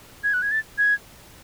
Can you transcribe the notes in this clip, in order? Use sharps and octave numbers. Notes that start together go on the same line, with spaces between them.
G#6
F#6
G#6
A6
G#6